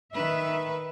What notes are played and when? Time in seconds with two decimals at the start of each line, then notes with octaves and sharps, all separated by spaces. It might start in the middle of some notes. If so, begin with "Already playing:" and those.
0.14 D#3 B4 E5